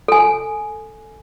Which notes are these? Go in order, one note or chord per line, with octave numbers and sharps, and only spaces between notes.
A4 G#5